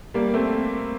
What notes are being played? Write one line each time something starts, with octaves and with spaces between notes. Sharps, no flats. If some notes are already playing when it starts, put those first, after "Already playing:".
G3 A#3
A3 C4